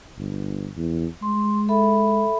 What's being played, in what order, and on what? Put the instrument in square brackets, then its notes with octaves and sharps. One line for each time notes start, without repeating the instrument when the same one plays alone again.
[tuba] G1
E2
[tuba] G#3 [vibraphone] C6
[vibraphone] A4 E5 B5